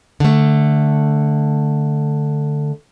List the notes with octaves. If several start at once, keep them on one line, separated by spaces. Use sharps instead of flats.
D3 A3